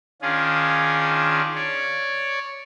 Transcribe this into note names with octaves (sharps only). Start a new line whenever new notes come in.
D#3 C#4 D4 F4 G#4
C#5 D5